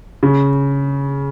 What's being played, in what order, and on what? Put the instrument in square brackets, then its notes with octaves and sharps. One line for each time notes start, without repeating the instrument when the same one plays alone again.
[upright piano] C#3